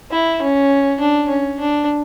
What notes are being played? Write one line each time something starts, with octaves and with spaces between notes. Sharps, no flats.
E4
C#4
D4
C#4
D4